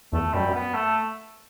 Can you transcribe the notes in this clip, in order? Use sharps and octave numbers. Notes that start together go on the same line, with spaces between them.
E2 A3
F#2 G3
B3
A3